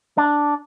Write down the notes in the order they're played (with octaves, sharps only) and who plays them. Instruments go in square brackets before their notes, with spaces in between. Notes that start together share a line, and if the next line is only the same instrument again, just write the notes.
[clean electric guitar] D4